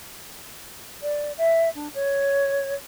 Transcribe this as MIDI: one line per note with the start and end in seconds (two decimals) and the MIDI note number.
1.02 1.32 74
1.37 1.69 76
1.74 1.87 62
1.94 2.72 73